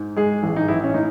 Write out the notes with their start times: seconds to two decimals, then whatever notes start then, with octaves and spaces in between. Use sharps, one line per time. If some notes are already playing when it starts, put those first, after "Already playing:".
Already playing: G#2
0.16 G#3 G#4
0.43 A1
0.56 D#4
0.68 A1 E4
0.84 C#4
0.94 A2 D#4